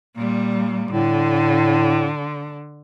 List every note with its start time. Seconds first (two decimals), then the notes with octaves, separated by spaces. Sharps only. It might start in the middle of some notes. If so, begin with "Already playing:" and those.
0.17 A#2 G3
0.91 A2 D3